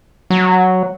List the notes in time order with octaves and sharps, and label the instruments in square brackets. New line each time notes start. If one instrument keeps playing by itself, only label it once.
[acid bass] F#3